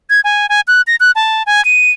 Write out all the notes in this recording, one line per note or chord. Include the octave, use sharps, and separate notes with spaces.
G#6
G#5
G#5
F#6
A#6
F#6
A5
G#5
D#7